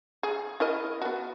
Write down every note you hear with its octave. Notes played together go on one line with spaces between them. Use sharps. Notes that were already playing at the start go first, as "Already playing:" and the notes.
G#4
E4 A#4 D#5
B3 F#4